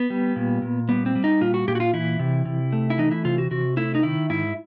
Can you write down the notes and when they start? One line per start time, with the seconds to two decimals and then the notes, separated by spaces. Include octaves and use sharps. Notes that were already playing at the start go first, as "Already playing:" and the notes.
Already playing: B3
0.10 G3
0.36 A#2
0.62 A#2
0.89 G3 B3
1.06 C4
1.15 G3
1.24 D#4
1.41 A#2 F4
1.54 F#4
1.68 A#2 G4
1.75 F#4
1.80 F4
1.94 E3 E4
2.19 C3
2.45 C3
2.72 A3
2.90 E4
2.98 E3 D#4
3.11 E4
3.25 C3 F4
3.38 F#4
3.51 C3 F#4
3.77 A3 E4
3.95 D#4
4.03 D#3 E4
4.30 G#2 E4